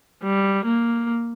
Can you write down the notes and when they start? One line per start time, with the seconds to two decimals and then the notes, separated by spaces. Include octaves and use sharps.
0.23 G3
0.65 A#3